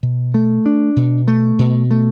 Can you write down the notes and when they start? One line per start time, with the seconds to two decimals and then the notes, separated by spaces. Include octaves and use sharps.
0.03 B2
0.34 A3
0.66 D4
0.96 B2
1.28 A3
1.59 B2
1.91 A3